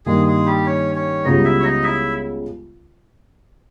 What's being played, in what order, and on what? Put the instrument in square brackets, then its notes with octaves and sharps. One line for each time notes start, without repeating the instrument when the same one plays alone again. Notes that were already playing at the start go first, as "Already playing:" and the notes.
[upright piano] G2 D#3 A#3 [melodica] G#3 G#4
[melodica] G#3 G#4
G3 G4
C#4 C#5
C#4 C#5
[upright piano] C#2 C#3 G3 B3 [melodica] D#4 D#5
[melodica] E4 E5
C#5
D#4 D#5
E4 E5